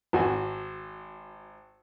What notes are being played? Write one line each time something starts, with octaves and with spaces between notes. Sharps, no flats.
G#1 F#4 G#5